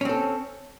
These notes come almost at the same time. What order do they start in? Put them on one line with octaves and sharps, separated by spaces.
C#4 C4 A4